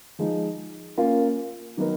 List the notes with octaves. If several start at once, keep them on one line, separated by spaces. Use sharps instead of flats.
F3 G#3 D#4
A#3 C#4 F4 A#4
D#3 F#3 B3 D#4 A#4